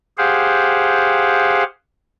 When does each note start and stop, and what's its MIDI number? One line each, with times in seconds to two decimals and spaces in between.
0.18 1.64 67
0.18 1.64 68
0.18 1.64 72
0.18 1.64 77
0.18 1.64 78